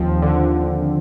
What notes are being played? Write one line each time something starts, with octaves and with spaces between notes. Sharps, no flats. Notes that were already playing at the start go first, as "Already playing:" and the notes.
Already playing: D#2 F3 C4
D3